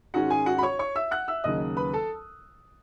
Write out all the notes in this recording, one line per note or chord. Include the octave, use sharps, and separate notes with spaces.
G#2 D#3 G#3 C#4 F#4 F#5
G#4 G#5
F#4 F#5
B5
C#5 C#6
C#5 C#6
E5 E6
F#5 F#6
E5 E6
D#2 C#3 F#3 C#4 D#5 D#6
B4 B5
A4 A5